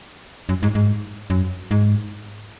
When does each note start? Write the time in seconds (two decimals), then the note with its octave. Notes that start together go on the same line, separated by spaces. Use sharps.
0.49 F#2
0.63 G#2
0.75 G#2
1.30 F#2
1.71 G#2